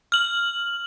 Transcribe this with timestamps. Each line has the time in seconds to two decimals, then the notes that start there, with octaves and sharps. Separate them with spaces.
0.12 F6 F#7